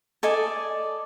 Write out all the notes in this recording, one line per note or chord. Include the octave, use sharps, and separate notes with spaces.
A4 D5 D#5 G#5